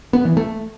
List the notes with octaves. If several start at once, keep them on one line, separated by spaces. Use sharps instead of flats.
B3
E3
A3